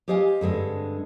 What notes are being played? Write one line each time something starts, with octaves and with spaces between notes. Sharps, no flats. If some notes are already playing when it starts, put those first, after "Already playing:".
G4 G#4 C5 D#5 F5 G#5
G2 D3 G#3 C4